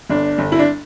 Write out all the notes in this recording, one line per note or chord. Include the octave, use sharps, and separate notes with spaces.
G1 D4
G1
E4
D4